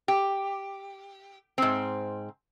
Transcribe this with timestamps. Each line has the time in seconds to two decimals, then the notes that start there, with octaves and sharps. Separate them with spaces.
0.08 G4
1.58 G#2 C4